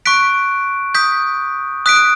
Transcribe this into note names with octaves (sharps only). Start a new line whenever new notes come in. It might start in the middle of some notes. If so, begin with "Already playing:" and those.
C#6 F#6 B6 D7
D#6 G6 B6
D#6 F#6 B6 D7